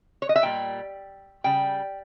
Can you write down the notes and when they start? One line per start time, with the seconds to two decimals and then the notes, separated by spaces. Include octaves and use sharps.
0.22 C#5
0.29 D#5
0.36 E5
0.43 A#2 G3 G5
1.44 C#3 G3 G5